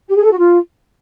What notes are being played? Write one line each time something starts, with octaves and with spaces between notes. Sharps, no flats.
G4
G#4
A4
F#4
F4